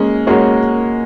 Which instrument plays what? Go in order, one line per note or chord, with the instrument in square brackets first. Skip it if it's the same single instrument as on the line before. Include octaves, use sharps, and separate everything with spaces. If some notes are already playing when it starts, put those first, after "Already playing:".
Already playing: [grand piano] G#3 C#4 [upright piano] A#3
[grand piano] G#3 C#4 [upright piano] A#3 F#4 C#5